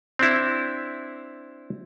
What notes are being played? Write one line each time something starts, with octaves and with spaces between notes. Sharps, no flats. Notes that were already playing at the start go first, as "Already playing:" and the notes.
C4 D4 E4